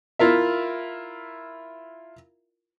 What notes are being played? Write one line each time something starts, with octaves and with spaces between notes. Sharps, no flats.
E4 F4 A#4 E5